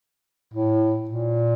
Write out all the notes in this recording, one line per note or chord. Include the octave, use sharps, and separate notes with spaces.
A2
A#2